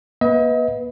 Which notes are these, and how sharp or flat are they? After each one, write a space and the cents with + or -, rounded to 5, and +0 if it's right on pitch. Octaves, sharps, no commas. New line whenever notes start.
A#3 +35 B4 +0 D#5 +40